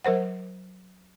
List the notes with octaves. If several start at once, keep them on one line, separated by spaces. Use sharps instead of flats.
F#3 A#4 C5 F#5